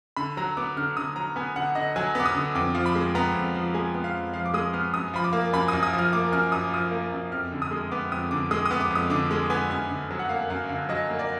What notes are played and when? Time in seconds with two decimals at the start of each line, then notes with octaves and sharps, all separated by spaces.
0.16 D3 B5
0.37 F#3 A#5
0.57 B3 D6
0.77 D3 F6
0.97 D3 D#6
1.16 F#3 A#5
1.36 B3 G#5
1.56 D3 F#5
1.75 D3 D#5
1.96 F#3 G#5
2.15 B3 D6
2.26 D#6
2.35 D3
2.55 F2 D6
2.75 F3
2.86 B5
2.95 G#3
3.15 B3 A#5
3.35 F2
3.55 F3
3.74 G#3 G#5
3.95 B3
4.04 F5
4.14 F2
4.33 F3 F5
4.46 D6
4.54 G#3 D#6
4.73 B3 F6
4.94 F#2 D#6
5.14 F3 B5
5.24 D6
5.33 A#3
5.53 F#2 B5
5.68 F#2 D#6
5.83 D#6
5.93 F3
5.98 F6
6.13 A#3 D6
6.32 F#2 F6
6.52 F#2 D#6
6.64 D6
6.72 F3 D#6
6.92 A#3
7.12 F#2
7.32 F2 F6
7.52 D3
7.62 D#6
7.71 G#3
7.92 B3 D6
8.11 F2 D#6
8.31 D3 D6
8.51 G#3 D#6
8.66 D#6
8.71 B3
8.81 D6
8.91 F2 D#6
9.10 D3 D6
9.31 G#3
9.50 B3 G#5
9.70 F#2 G#5
9.90 D3
10.11 F#3
10.19 F#5
10.29 A#3 F5
10.50 F#2 F5
10.69 D3 F5
10.89 F#3 D#5
11.10 A#3
11.19 D5